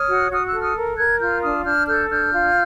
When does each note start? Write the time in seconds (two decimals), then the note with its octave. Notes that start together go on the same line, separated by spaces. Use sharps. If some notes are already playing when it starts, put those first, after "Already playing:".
Already playing: C#5 D#6 F6
0.09 F#4
0.31 F#4 D#6 F6
0.46 E6 F#6
0.53 A4
0.61 D#6 F6
0.76 A#4
0.97 A#4 F#6 G#6
1.20 F4 F6 G6
1.43 D4 D#6 F6
1.65 D4 F6 G6
1.87 A4 F6 G6
2.09 D4 F6 G6
2.32 F4